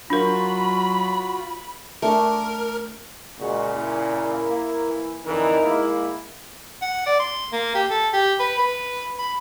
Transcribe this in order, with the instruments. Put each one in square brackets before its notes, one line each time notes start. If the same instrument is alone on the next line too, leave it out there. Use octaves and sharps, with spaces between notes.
[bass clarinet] F#3 [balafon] D4 A#4 [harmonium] F4 F#4 [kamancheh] B5
[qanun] A3 D4 C#6 [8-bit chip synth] A#4
[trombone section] A#2 C#3 [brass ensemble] G#3 F#4
[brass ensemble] A#3 E4
[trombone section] E3
[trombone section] F2 D3 E3 [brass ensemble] D#4 A#4
[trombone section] G#3 A#3 E4
[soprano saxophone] F#5
D5
C6
A#3
G4
A4
G4
B4
B4
B5